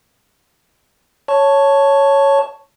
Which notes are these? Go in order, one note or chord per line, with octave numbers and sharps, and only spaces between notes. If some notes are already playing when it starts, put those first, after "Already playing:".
C#5 A5 C#6